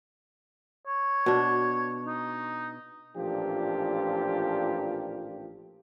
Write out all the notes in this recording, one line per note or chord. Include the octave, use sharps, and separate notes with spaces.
C#5
B2 D4
D#4
A1 A#2 F3 D4 F4 G4